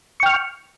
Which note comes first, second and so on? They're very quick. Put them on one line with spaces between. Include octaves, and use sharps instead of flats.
C#6 G5 F6